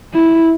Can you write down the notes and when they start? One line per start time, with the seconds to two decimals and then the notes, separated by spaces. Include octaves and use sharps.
0.14 E4